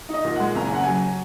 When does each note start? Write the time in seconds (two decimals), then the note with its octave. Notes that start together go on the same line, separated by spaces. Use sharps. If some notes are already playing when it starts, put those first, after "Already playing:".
0.09 D#4
0.14 D#5
0.25 A#2
0.36 F#5
0.40 G#3
0.55 F#1 A#5
0.65 G#5
0.71 C#3 F#5
0.84 F#3 G#5